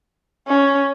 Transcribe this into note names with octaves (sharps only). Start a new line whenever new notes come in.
C#4